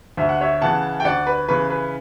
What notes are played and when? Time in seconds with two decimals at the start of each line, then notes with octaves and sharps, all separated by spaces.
0.17 D2 E5
0.29 F#5
0.41 C#5 E5
0.61 C#3 E3 F#5 A5
1.00 G5
1.05 D2 D5 F#5
1.27 B4
1.48 C#3 E3 B4
1.70 B4